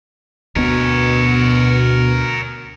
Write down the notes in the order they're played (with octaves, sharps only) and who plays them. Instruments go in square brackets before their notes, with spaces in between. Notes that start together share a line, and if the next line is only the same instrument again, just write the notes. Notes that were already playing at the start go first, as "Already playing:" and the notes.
[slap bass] D2 B3 [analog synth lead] B2 [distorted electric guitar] A#4 C#5